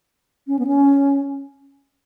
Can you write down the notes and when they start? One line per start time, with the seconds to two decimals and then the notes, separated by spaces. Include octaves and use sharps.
0.48 C#4
0.59 B3
0.67 C#4